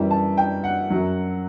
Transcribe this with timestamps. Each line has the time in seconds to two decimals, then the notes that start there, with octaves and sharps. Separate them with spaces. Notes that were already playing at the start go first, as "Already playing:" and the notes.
Already playing: F#2 E3 G3
0.11 A5
0.37 G5
0.64 F#5
0.90 F#2 F#3